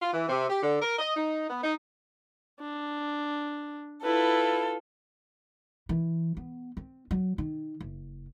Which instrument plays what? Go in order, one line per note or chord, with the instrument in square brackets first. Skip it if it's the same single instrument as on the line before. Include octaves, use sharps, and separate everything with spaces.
[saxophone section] F4
E3
C3
G4
D3
A#4
D#5
D#4
B3
D#4
[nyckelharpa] D4
[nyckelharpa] E4 B4 [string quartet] F4 A4
[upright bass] E3
B3
C4
F#3
D#3
F#1